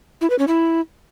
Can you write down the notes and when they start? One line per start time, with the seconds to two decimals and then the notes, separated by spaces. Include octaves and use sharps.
0.21 E4
0.30 B4
0.39 C#4
0.47 E4